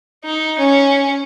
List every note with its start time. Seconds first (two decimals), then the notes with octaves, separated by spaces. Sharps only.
0.24 D#4
0.58 C#4